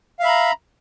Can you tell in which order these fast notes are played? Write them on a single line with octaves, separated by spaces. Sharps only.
F5 E5 B5 A#5